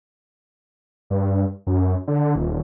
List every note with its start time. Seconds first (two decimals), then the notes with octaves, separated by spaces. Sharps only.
1.10 G2
1.67 F#2
2.08 D3
2.36 D#1